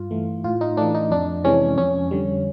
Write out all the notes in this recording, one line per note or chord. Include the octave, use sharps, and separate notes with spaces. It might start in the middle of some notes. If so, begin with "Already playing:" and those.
Already playing: G2 F4
E3 A3
A2 F4
D#4
E3 A3 D4
D#4
F2 D4
C3 E3 G#3 C#4
F2 C#4
D3 G3